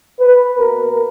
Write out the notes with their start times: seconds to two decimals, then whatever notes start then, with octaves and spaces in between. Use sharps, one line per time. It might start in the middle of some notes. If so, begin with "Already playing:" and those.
0.20 B4
0.57 B2 A#3 A#4